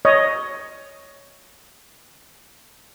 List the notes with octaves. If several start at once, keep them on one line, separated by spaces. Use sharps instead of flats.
C#5 D#5